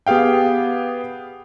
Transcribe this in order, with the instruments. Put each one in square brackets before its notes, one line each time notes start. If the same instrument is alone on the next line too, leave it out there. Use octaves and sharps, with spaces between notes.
[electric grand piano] B3 G4 G#4 F5 G5